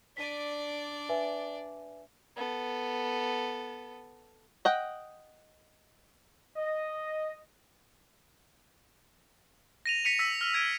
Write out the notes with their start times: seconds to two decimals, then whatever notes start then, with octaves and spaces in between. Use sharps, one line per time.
0.17 D4 D5 B6 D#7
1.09 B4 E5 G#5
2.36 B3 A4
4.65 D#5 F#5 G5
6.56 D#5
9.86 A#6 D#7 F7
10.05 B6 C#7 D#7 F7
10.19 E6 A#6 B6
10.41 F6
10.54 G#6 D7 D#7